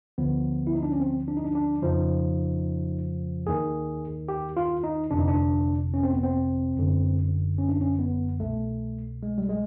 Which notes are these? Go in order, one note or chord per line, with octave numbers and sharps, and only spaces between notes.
D2 D3 F3 B3
E4
D#4
D4
C#4
C4
D4
D#4
D4
D4
F2 C#3 F3 D#4
D#2 D#3 G#4
G4
F4
D#4
G1 F2 C3 D4
D#4
D4
C#4
C4
B3
C4
G1 F#2 D3
C#4
D4
C#4
B3
C2 B2 A3
G#3
G3
G#3